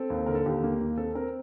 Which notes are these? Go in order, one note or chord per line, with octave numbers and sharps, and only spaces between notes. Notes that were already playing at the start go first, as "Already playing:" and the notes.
Already playing: C4 A4
D#2
D3 A#4
A4
D#2 G4
A#3
D#2
C4 A4
C4 A#4